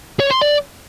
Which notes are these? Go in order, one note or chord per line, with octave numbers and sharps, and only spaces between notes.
C#5
C6
D5